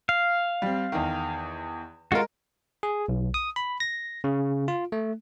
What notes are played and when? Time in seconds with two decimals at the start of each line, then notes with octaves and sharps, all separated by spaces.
0.09 F5
0.62 G3 C4
0.92 E2 D#3
2.12 G#3 F4 F#4 A#4
2.83 G#4
3.08 B1
3.34 D#6
3.56 B5
3.80 A#6
4.24 C#3
4.68 F4
4.92 A3